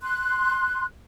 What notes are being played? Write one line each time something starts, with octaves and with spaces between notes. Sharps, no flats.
C6 F#6